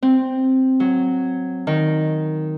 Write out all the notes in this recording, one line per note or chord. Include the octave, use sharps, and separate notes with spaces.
C4
F#3
D#3